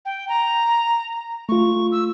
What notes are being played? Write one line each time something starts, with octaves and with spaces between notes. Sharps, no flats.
G5
A#5
A3 F4 C#6
E6